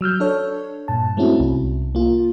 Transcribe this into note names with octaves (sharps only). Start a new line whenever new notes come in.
F#3 E6 F6 G6
D4 A4 C#5
G2 A#2 A5
G#3 A3 C4 C#4 E4 F#4
C2
A#3 F4